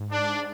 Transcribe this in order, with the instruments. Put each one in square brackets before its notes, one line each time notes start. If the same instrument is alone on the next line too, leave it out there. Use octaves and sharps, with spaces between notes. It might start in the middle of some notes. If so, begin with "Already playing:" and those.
Already playing: [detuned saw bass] G#2
[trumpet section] D4